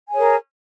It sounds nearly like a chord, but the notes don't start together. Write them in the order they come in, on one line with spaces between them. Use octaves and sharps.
G#5 G#4 C#5 A#4